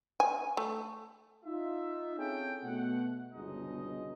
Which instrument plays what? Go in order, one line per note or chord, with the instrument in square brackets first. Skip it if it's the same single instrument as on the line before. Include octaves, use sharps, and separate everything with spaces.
[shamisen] G#5
A3
[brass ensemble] D#4 F4 E5
C4 C#4 E4 G#4 A4 G5
B2 A3 F#5
G1 C#2 B2 G#3 D#4 D#5